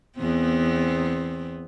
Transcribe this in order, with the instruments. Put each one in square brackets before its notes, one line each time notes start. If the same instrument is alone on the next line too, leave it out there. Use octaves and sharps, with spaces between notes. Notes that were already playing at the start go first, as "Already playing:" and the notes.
[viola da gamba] E2 B3 C4